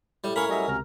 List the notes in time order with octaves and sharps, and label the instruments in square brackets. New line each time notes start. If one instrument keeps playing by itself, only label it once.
[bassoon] A2 [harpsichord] G3
[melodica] C#4 E4 F5 [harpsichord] A#4 C#5 [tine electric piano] B5
[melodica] F#3 C#4 [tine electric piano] G3 D#5 E5
[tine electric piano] C#2 C3 A#5 [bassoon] A#4